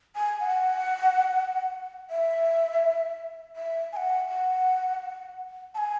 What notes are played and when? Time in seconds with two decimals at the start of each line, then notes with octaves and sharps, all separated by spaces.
0.16 G#5
0.40 F#5
2.10 E5
3.56 E5
3.93 G#5
3.97 F#5
4.29 F#5
5.75 A5
5.78 G#5